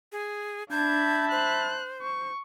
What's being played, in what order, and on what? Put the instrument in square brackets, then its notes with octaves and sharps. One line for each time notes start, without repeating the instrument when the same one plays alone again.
[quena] G#4
[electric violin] D4 G#6 [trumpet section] E5 A5 B5 [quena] G6
[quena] C5 [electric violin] F#6
[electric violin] C#6